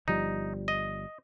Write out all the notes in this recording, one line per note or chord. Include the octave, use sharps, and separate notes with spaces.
G1 F3 G3 D#4
D#5